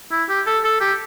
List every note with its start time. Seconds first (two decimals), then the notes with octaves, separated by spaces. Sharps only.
0.12 E4
0.29 G4
0.46 A4
0.64 A4
0.81 G4